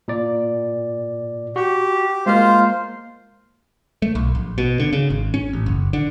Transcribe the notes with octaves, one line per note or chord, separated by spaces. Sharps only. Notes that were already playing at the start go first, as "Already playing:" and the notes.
A#2 D5
F#4 G4
G#3 A#3 F4 C5 F6
A3
B1
A#1
B2
D3
C#3
G#1
C#4
A1
F#1
D3